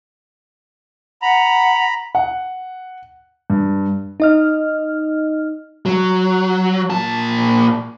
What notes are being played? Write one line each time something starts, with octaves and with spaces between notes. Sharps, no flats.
F#5 A#5 B5
F#5
G2
D#4 D#5 F6
F#3
A#2 A5